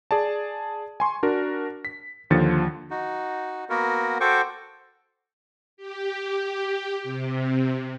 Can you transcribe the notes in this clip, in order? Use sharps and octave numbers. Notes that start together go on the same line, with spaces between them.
G#4 D5 A5
G#5 C6 C#6
D4 F#4 A#4
B6
D#2 D3 F3 A6 C#7
D#4 F#4
A#3 B3 F#4 A#4
F#4 A4 C5 G5 C#6 D6
G4
C3